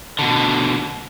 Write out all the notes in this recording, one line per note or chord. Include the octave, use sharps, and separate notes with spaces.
B2 D3